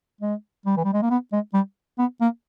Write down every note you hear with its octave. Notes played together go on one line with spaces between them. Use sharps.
G#3
G3
E3
G3
G#3
A#3
B3
G#3
G3
B3
A#3